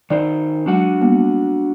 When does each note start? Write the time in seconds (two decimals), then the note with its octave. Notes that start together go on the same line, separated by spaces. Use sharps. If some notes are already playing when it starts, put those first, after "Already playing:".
0.10 D#3 D#4 C5 D5
0.66 F#3 G#3 D4 F#4 F#5
1.01 G3 A#3 B3